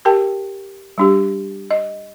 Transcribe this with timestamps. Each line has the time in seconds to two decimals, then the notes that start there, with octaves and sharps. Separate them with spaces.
0.05 G4 A#4 G5 A5
0.98 G3 D4 G4
1.71 D#5